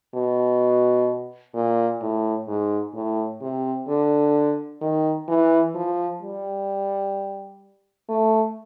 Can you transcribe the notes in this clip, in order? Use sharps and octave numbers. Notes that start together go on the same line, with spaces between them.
B2
A#2
A2
G#2
A2
C3
D3
D#3
E3
F3
G3
A3